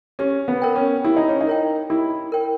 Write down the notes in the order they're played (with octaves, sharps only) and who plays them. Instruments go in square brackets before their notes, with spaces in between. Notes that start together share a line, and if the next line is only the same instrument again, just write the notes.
[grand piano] C#4 [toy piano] G4
[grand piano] B3
[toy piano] A#4 C#5 G5
[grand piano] C#4
[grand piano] E4 [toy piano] G4
[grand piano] D#4
C#4
D#4
[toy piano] A#4 C#5 G5
[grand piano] E4 [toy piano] G4
[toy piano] A#4 C#5 G5